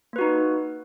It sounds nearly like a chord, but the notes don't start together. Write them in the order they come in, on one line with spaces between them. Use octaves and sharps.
A#3 B4 F#4 D#4